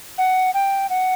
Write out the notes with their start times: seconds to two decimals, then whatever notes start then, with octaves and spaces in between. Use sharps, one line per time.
0.18 F#5
0.54 G5
0.90 F#5